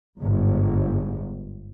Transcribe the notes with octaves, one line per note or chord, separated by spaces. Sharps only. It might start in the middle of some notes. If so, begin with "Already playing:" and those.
G1 G#2